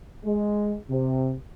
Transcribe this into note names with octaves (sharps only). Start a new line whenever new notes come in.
G#3
C3